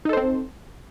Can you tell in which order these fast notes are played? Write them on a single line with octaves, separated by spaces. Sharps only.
D#4 A4 C5 C4